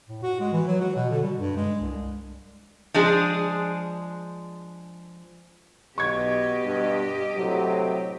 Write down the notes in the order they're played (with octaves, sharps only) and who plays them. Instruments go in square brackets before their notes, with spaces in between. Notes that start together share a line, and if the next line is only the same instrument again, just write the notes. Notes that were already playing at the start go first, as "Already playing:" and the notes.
[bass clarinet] A2
F#4
G#3
E3
F#3
F#4
B2
D3
G3
G2
G#3
C2
[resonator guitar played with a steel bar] F3 G#3 D4 G#4
[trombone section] B1 [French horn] B2 [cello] G4 D#5 [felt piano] C#6 G#6
[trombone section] G2
[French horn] A2 [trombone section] C3 F#3